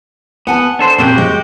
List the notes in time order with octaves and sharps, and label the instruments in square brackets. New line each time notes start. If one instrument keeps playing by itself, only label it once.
[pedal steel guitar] B3 [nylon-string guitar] F#5 G#5 A5
[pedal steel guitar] D4 A4 C5
[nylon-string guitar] A#2 C#3 C4 [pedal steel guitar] F#4 G4 G5
[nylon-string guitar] G#3